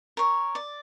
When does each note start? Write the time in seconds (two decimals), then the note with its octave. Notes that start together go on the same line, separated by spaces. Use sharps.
0.17 A#4 C#5
0.55 D5